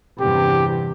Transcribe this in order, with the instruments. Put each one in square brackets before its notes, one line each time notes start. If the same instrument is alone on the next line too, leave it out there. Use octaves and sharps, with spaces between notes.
[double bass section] E2 G2 C3 [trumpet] G4